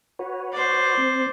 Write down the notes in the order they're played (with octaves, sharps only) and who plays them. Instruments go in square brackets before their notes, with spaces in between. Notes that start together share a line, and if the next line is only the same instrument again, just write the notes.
[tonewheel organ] F#4 B4 C#5
[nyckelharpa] C5 D5
[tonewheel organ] C4